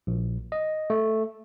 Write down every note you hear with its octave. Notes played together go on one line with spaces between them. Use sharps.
A#1
D#5
A3